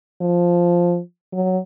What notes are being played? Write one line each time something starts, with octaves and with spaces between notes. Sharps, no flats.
F3
F#3